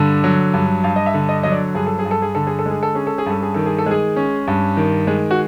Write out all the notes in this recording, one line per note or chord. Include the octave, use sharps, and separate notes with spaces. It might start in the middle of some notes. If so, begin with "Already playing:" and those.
Already playing: G2 D3
F#3
G2
G2 F5
D#5
E5
D3
D#5
F#3 D#5
D5
G2 G#4
A4
G#4
G2
A4
G#4
D3 A4
G#4
A4
G#3 G#4
A4
C#4 G#4
A4
G#4
G2 A4
G#4
D#3 A4
G#4
A4
G#3 G#4
C#4
G2
D#3
G#3
F#4